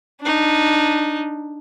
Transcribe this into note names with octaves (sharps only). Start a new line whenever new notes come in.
D4 D#4